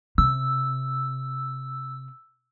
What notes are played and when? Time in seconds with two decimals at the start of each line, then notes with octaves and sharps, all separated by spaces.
0.18 C3 E6